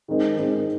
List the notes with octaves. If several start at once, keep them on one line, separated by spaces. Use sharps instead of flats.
D#3 G#3 C4 D#4 A#4
D#3 G#3 C4 D#4 A#4